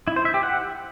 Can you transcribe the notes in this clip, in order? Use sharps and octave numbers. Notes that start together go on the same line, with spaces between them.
E4
C5
E5
G4
F#5